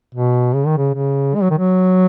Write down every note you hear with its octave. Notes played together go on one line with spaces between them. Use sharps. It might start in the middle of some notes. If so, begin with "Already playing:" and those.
B2
C#3
D#3
C#3
C#3
G#3
F#3
D#3
F#3